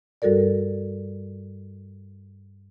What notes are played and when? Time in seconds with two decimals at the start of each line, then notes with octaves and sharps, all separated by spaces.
0.22 G2 G3 F#4 A4 A#4 D5